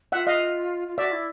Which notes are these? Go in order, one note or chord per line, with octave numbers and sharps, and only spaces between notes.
F4 E5 F#5
D#5 F5
F4
F#4 D5 E5
E4